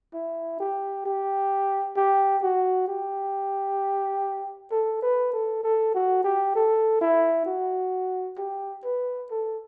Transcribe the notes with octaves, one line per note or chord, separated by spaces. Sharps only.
E4
G4
G4
G4
F#4
G4
A4
B4
A4
A4
F#4
G4
A4
E4
F#4
G4
B4
A4